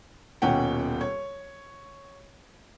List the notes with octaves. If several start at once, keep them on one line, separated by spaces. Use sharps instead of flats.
D#1 D#2 B2 C#4 F#5 G5
C#5